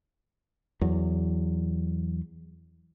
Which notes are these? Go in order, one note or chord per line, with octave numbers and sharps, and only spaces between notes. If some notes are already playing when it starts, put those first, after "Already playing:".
E2 F#3